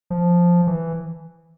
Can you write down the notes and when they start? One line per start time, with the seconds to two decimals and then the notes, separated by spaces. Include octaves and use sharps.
0.10 F3
0.67 E3